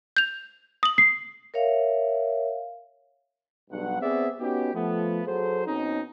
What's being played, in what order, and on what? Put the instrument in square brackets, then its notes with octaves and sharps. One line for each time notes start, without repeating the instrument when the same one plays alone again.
[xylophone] G6 F7
D#6 F#7
[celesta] C7
[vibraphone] A#4 C#5 E5 F5
[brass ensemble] B1 G2 F#5
B3 C4 G#4 C5 D5 E5
B3 C#4 D#4 F#4 G4
F3 A3 B3
F#3 G#4 A4 C5
B2 C4 C#4 D#4